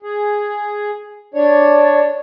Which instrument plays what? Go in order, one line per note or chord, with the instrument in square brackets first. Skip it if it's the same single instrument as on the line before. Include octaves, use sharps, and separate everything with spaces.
[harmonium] G#4
[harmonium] D4 C#5 [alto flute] D5